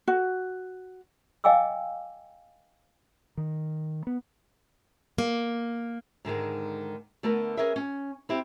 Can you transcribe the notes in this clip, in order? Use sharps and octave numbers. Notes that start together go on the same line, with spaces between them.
F#4
D#5 F5 G5 G#5 D6 E6
D#3
B3
A#3
G#2 D3 D#3 G#3
D3 A3 B3 A#4 B4
C#4 G#4 A#4 B4 E5
C#4
C4 E4 G4